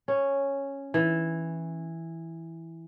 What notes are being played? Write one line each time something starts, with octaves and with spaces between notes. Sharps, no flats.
C#4
E3